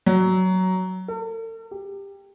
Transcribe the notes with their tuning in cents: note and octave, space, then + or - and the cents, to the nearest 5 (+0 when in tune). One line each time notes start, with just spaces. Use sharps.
F#3 +10
A4 +45
G4 +15